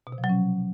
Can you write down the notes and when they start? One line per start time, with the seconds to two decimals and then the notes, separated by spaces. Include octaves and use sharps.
0.07 B2
0.12 C3
0.18 F3
0.24 F#3
0.29 C#4